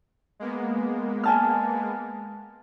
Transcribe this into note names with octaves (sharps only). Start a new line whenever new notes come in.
G#3 A#3 B3
G#5 A5 F6